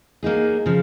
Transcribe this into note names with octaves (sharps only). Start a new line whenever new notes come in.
F#3 A#3 D#4 G#4
C#3 F3